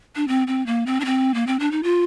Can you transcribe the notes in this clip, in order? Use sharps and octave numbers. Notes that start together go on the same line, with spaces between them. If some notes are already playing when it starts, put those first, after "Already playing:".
D4
C4
C4
A#3
C4
D4
C4
A#3
C4
D4
D#4
F4